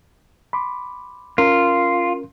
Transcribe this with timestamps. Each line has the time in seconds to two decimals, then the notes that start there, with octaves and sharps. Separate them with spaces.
0.53 B5 C6 D6
1.38 C#4 F4 A#4